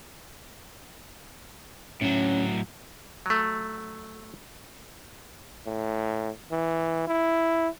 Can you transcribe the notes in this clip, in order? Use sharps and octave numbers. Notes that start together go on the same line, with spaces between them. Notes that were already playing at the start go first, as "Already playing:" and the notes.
A2 F#3 C#4
F#3 A3
A2
E3
E4